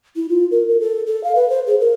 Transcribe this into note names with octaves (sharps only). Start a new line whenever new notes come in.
E4
F4
A#4
A#4
A4
A4
F5
B4
C5
G#4
A#4